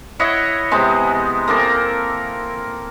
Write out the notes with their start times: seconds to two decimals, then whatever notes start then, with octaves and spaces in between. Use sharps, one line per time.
0.20 E4 C#5 D#5 F#5
0.71 C3 G#3 B3 C4
1.48 A#3 C4 A4 A#4